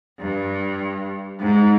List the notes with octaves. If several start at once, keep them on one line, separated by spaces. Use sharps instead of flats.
G2
G#2